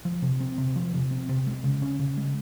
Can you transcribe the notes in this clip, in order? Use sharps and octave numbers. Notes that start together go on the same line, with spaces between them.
F3
C3
C4
C3
F3
C3
C4
C3
G#3
C#3
C#4
C#3
G#3